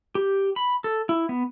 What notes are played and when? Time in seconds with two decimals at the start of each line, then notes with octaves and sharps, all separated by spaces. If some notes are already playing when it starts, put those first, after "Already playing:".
0.15 G4
0.56 B5
0.84 A4
1.09 E4
1.29 B3